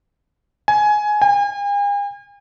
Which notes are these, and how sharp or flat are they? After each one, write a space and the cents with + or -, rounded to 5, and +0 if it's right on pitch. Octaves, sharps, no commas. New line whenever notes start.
G#5 +15
G#5 -45